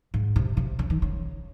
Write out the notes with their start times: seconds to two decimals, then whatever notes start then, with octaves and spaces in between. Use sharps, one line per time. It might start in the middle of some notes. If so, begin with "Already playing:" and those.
0.14 G#2
0.36 C3
0.57 C3
0.79 C#3
0.90 D#3
1.02 C#3